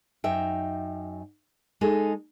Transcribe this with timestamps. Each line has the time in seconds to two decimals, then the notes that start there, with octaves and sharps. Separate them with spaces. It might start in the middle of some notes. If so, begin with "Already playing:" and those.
0.24 F#2 D#4 E5 G5
1.81 G#3 D#4 G#4 A4